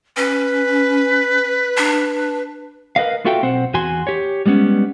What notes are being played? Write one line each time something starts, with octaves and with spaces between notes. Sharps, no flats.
C#4 B4
D4
A#4 B4 D#5 F5
F4 F#4 A4 E5 F5 G5
B1 C4 C5 F#5
E2 F#4 G#5 C6
G4 C#5
G3 G#3 B3 C#4